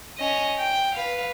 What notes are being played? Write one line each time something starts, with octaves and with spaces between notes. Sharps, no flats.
C#4 D#5
G5
B4 F5